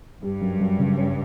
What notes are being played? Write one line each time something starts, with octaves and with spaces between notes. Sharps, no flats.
G2 G3
F#2
F#2
C#3
C#4